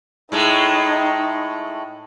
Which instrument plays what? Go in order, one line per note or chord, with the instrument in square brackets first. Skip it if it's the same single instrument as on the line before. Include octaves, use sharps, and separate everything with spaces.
[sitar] A2 G#3 A3 [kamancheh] D#4